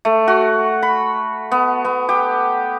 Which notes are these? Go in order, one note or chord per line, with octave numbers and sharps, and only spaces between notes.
A3
F#4
B5
B3
B3
G4